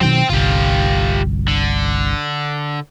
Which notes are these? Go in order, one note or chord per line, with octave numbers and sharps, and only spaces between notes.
B2 D#3 F#3 C4 G5
G1 C2 F4 G4
D3